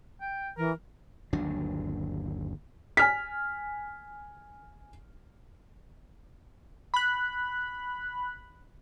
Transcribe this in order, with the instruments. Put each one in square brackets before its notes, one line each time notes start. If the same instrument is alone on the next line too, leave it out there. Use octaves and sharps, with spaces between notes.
[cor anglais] G5
[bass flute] E3 [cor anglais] A#4
[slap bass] G1 D#2 F#3 D4
[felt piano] G#5 F6 B6
[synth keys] B5 F#6